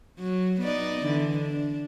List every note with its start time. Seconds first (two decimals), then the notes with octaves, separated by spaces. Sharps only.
0.19 F#3
0.61 B3 D#4 D5
1.04 D3 E3
1.37 D4